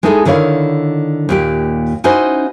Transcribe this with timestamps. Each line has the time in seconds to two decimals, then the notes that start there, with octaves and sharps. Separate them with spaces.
0.03 G#3 B3 D#4 E4 G#4 A4
0.25 D3 D#3 E4 C#5 D5 F5
1.29 D#2 A#2 G4
2.04 C#4 D#4 E4 F#4 C5